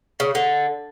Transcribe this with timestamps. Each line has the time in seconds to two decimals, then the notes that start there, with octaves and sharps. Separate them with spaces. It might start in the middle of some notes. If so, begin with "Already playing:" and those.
0.20 C#3
0.35 D3